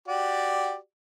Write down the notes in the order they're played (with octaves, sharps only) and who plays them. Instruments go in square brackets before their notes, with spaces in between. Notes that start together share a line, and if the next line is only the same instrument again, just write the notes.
[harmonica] F#4 G4 D5